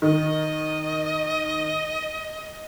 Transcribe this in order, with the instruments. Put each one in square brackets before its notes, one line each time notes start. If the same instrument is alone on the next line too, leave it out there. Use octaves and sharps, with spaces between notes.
[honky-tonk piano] D#3 [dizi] D#5